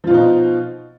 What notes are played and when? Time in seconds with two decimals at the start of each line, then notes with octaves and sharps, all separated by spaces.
0.04 F3
0.07 F4
0.11 B2
0.14 D#4
0.17 C4